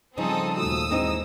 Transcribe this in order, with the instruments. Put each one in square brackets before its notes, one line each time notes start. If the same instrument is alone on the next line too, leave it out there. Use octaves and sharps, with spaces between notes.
[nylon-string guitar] C#3 C#4 D#4 [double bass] F3 G3 [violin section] C4 A4 D#6
[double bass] D#2 A#2 [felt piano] A3 F4 F#4 [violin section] D#6 E6
[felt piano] G2 G#3 [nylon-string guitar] E3 C4 D#4